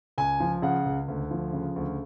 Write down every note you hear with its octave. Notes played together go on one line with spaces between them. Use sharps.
C#2 G#5
F3
C#3 F#5
C#2
D2
F3
C#3
D2